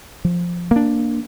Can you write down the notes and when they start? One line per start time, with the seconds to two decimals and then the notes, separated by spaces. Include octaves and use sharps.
0.25 F3
0.71 A#3 D4